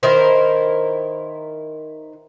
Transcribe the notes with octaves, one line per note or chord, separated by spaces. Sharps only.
D#3 E4 A#4 C5